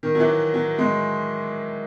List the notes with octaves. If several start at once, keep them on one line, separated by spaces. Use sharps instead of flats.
D#3
F#3
E3
F#3
G#3